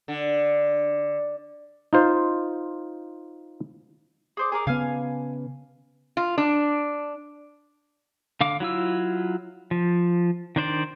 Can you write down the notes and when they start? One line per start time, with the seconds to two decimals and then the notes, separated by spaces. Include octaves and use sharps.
0.08 D3
1.93 D#4 F4 C5
4.37 G#4 C5 D5
4.52 G#4 A#4 D5
4.67 C#3 B3 F5 G#5 F6
6.17 F4
6.38 D4
8.41 D3 F5 D6
8.60 F#3 E4 F4 E6
9.71 F3
10.56 D#3 D4 C5 D5